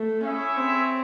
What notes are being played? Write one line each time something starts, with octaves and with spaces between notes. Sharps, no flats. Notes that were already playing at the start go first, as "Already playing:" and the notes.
Already playing: A3
C#4 E4 G#4 C#5 E5
C4